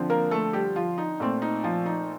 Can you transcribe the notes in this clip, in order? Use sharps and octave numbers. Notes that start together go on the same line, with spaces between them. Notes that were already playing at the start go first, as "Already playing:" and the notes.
Already playing: D3 F3 C4
A#3 A#4
A3 A4
G3 G4
F3 F4
D#4
A#2 A3 C4
D#4
F3 F4
D#4